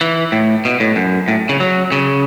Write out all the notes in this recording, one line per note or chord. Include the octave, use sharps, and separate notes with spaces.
E3
A2
B2
A2
F#2
A2
C#3
F#3
C#3